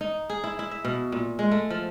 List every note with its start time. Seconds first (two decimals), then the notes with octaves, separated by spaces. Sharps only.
0.01 D#4
0.30 G#4
0.44 E4
0.59 E4
0.71 E5
0.85 B2
1.12 A#2
1.39 G#3
1.51 A3
1.70 F3